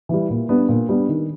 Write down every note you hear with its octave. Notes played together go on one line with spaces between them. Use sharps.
E3 G3
A#2
G3 B3 D4
A#2
G3 B3 D4
D#3